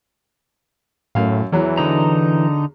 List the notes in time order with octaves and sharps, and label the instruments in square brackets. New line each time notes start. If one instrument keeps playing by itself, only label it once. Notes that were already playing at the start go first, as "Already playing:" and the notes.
[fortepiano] F#2 F5 [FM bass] A2
[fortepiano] E2 F#3 [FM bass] E3
[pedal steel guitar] D3 D#4 A#5